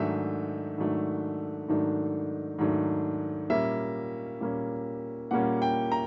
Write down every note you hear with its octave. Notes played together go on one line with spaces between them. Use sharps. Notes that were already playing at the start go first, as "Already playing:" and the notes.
Already playing: G#2 D#3 F#3 A3 D4 E5
G#2 D#3 F#3 A3 D4
G#2 D#3 F#3 A3 D4
G#2 D#3 F#3 A3 D4
A#2 G3 A#3 C#4 E5
A#2 G3 A#3 C#4
A#2 G3 A#3 C#4 F#5
G5
A#5